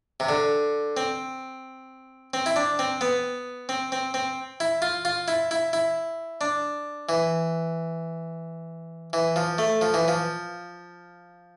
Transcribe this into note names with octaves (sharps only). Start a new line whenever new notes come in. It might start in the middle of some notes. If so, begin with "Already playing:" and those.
C3
D3
C4
C4
E4
D4
C4
B3
C4
C4
C4
E4
F4
F4
E4
E4
E4
D4
E3
E3
F3
A3
F3
E3
F3